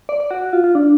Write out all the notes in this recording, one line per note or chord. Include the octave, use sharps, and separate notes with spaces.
D5
D5
F#4
F#4
F4
F4
D4